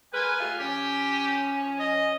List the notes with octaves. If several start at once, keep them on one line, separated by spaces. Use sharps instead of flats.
G#3 A#4 B4 G#5
G3 A3 F4
F3 C#4 G4
D#5